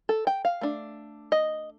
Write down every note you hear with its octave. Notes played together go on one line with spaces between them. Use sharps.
A4
G5
F5
A3 D4
D#5